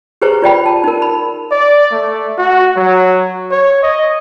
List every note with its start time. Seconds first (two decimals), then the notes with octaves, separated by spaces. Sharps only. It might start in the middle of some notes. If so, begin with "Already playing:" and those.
0.22 G4 G#4 B4 C5 A#5 C#6
0.42 F4 D5 G5 B5
0.66 A5
0.84 D#4 A#4
1.02 B5
1.51 D5
1.92 A3
2.38 F#4
2.76 F#3
3.51 C#5
3.83 D#5